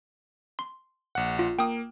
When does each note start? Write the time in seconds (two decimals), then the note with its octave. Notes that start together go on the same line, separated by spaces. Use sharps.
0.59 C6
1.15 A#1 F#5
1.39 F4
1.59 A#3 G5 D#6